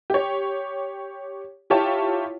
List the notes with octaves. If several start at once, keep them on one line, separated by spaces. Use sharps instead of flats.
G4 C#5
E4 F4 G4 C#5 A5